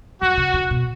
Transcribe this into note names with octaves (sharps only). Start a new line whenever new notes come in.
F#2 F#4
C#3
D3
B2